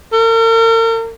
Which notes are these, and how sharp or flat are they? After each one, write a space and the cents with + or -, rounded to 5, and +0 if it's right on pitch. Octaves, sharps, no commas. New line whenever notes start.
A#4 -45